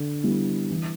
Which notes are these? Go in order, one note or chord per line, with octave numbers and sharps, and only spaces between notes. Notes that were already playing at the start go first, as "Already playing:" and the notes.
Already playing: D3
G3 B3 E4
E3